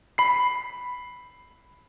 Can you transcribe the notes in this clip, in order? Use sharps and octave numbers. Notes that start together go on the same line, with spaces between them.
B5 C7